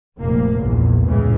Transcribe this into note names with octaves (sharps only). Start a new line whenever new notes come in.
F1 A#1 A#3
A#1 E2 G2
C#2 A2 C#3 E3 G#3